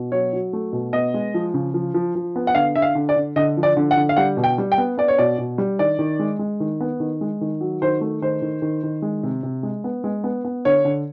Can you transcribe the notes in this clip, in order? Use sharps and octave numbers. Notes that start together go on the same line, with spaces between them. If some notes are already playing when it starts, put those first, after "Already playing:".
Already playing: B2
F#3 C#5
F#3
A3
B2
B3 D#5
G#3
F3
C#3
F3
F3
F3
B3
F#5
D3 F5
D3 E5
F5
D3
D5
D3
D3 D#5
F3
D5
D3
F#5
D3
F5
G3 F#5
B2
G5
G3
G5
B3
B3 D5
C#5
B2 D5
B2
G3
D#3 D5
D#3
G#3
G#3
D#3
B3
D#3
G#3
D#3
F#3
D#3 C5
A3
D#3 C5
D#3
D#3
D#3
G#3
C3
C3
G#3
B3
G#3
B3
B3
D3 C#5
D3